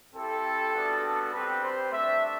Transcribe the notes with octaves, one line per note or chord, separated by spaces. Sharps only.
C4 E4 G4 A4
G3 B3 D4 F#4
A4
G3 C4 G4 B4
C5
A3 D4 G4 E5